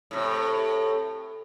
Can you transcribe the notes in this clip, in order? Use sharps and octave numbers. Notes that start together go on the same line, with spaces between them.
A2 C3